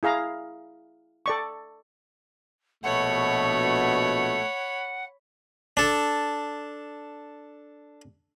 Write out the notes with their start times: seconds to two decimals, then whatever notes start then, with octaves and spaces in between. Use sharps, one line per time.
0.03 E4 G#4 F5 A#5
1.26 A4 D5 C#6
2.84 A#1 B2 A3 C#5 F#5 B5
5.77 D4 A4